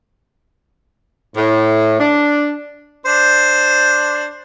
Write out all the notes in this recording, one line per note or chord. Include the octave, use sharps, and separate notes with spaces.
A2
D4
D4 C5